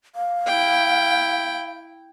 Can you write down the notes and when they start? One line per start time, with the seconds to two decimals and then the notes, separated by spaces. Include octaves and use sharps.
0.15 F5
0.47 E4 G5